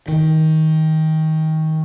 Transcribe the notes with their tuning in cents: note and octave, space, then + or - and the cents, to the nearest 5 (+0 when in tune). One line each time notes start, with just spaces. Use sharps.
D#3 +20